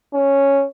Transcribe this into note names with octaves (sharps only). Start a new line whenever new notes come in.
C#4